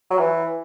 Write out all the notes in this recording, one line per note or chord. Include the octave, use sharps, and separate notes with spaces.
F#3
E3